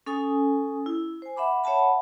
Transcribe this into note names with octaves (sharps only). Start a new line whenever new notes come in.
C#4 A4 G#5 D#6
E4
C5 G#5
E5 F#5 B5 D6
C#5 E5 F#5 A5 B5